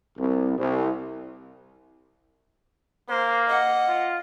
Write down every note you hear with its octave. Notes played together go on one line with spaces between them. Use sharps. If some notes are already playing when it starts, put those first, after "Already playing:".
C2
C2
A#3 C5
D#5 F#5
F4